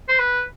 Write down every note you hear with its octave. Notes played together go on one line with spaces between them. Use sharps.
C5
B4